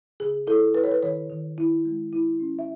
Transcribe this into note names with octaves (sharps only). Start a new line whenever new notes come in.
C#3 G#4
E4 A4
E4 B4
C#5
B4
D#3 C#5
D#3
E4
G#3
E4
C#4
E5